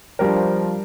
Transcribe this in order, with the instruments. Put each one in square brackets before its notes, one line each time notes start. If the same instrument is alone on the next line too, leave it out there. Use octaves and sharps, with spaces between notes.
[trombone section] F3 [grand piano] G3 D4 G4 A#4